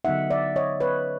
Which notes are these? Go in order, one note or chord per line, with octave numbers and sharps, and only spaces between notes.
D3 F#3 B3 D#4 E5 F#5
D5 E5
C#5 D#5
B4 C#5